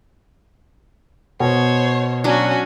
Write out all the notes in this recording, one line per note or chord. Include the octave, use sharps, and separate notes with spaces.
B2 C5 C#5
F#3 C#4 D4 F#4